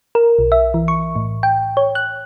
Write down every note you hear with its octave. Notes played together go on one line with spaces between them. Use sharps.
A#4
B1
E5
E3
C#6
A2
G5
C#5
F#6